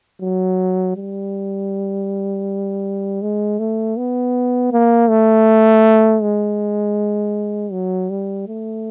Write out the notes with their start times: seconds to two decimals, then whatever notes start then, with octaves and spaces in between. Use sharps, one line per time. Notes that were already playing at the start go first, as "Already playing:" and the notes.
0.22 F#3
0.96 G3
3.22 G#3
3.59 A3
3.97 B3
4.72 A#3
5.09 A3
6.22 G#3
7.72 F#3
8.10 G3
8.47 A3